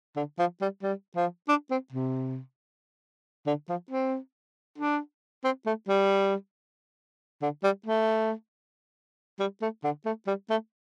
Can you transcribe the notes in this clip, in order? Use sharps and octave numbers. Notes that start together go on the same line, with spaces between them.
D3
F3
G3
G3
F3
D4
C4
C3
D3
F3
C4
D4
C4
A3
G3
D3
G3
A3
G3
A3
D3
A3
G3
A3